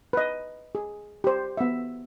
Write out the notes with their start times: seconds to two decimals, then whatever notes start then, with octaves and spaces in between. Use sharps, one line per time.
0.13 B4 D#5
0.75 G#4
1.24 G4 C5
1.57 B3 E5